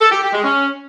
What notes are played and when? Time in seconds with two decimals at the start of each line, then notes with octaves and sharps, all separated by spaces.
0.01 A4
0.11 G4
0.22 G4
0.33 G#3
0.44 C#4